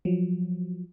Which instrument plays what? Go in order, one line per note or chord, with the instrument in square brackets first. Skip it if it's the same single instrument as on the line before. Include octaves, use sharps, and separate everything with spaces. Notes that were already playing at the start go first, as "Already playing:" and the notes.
[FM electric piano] F3 F#3